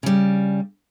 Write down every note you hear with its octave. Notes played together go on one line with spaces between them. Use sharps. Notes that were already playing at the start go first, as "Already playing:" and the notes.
C#3 G3